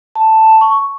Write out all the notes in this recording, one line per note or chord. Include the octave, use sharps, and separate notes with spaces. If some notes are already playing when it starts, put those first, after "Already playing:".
A5
C#6